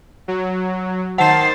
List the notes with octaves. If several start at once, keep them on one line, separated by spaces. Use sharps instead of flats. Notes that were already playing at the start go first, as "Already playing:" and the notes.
F#3
D#3 C5 F#5 A5 A6 C7